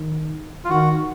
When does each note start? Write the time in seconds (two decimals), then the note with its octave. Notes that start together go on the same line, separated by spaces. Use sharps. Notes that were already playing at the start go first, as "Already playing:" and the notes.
Already playing: D#3
0.65 F4
0.70 D#3 F#4